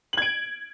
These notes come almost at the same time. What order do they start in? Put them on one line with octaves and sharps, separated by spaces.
F#7 G#6 D7